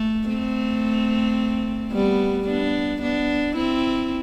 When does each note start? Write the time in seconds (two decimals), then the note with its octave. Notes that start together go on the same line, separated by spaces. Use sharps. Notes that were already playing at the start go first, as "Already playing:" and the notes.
Already playing: A3
0.28 A3 C4
1.92 G3 B3
2.47 B3 D4
3.01 B3 D4
3.56 C4 E4